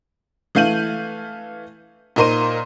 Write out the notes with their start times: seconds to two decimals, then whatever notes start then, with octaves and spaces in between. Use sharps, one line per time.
0.55 E3 A3 F5 G6 D#7 F#7
2.16 A#2 D#4 A#4 C5 C6 D#7